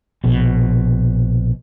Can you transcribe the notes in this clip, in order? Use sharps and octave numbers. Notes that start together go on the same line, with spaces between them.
A#1 B2